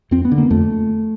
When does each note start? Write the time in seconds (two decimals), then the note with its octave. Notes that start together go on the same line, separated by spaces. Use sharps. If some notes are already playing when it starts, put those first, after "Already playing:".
0.11 F2 C4
0.25 B3
0.32 D3
0.38 A#3
0.51 F2 A3